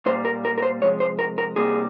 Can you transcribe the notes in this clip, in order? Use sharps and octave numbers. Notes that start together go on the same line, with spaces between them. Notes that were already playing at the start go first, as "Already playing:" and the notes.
A#2 G3 A#3 C5
A#4
A#4
A#4
C5
C3 F3 G#3 C#5
C5
A#4
A#4
C3 G3 A#3 G#4